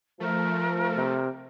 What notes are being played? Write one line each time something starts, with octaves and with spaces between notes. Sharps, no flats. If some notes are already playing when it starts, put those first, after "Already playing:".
F3 A3 A#4
C3